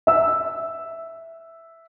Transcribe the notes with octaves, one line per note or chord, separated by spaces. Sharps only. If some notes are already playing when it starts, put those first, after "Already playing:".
E5 E6